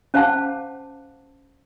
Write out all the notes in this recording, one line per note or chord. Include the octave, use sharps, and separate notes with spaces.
C#4 C5 F5 F#5 A5 D6